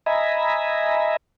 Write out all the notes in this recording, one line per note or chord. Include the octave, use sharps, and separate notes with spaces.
D#5 E5 G#5 A#5 B5